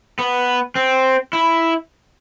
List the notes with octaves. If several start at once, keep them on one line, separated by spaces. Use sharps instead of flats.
B3
C4
E4